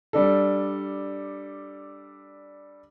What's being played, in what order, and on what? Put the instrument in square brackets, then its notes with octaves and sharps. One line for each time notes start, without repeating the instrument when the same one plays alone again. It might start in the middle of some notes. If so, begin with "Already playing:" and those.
[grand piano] G3 D4 A4